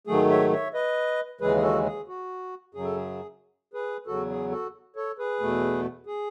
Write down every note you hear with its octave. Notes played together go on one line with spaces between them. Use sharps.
G#2 D#3 F#3 A3 G#4
C#5 E5
C#5 E5
B4 D#5
D#2 C#3 E3 G#3 G#4 B4
G#4
F#4 A4
G#4
F#4
F#2 C#3 F#3 G#4
A4
G#4
G#4 B4
E2 C#3 F#3 F#4 A4
G#4
F#4 A4
A4 C#5
G#4 B4
E2 B2 A3
G#4